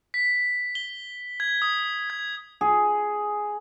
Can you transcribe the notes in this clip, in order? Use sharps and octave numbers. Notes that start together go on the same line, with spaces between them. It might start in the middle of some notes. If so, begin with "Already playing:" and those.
B6
G7
G#6
D#6
G#6
G#4